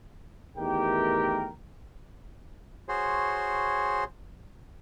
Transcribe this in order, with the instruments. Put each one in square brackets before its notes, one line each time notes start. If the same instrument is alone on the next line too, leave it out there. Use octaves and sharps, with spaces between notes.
[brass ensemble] E2 D#3 A3 G4 A#4 G5
[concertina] F#4 G#4 C5 C#5 C6